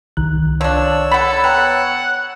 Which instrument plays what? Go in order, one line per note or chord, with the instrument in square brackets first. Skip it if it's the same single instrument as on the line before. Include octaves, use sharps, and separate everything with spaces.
[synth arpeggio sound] C2 D#3 F#6
[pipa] F3 D4 [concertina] C#5 E6
[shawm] A4 [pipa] F#5 B5
[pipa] B3 [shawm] F#5 [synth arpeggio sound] G5 A#5